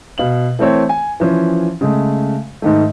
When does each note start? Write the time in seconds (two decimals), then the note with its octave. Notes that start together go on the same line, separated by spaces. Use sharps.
0.18 B2 F5 F#7
0.59 E3 A3 C4 C#5
0.89 G#5
1.20 E3 F3 C#4
1.81 C#3 G#3 A3
2.62 G#2 D#3 A3